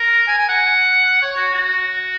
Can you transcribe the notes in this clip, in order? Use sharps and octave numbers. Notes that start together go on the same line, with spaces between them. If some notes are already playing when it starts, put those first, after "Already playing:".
Already playing: A#4
G#5
G#5
F#5
C#5
F#4
F#4